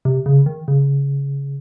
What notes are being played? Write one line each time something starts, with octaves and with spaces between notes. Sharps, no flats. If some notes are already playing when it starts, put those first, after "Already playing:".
C3
C#3
D#3
C#3